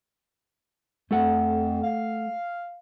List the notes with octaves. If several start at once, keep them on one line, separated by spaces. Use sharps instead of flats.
F2 A3 A4 F#5
F5